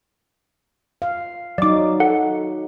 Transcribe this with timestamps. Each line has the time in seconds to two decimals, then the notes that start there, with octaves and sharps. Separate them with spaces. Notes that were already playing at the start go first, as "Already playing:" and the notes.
1.02 F5
1.58 F#3 D#4 D5 D6
2.00 A4 F#5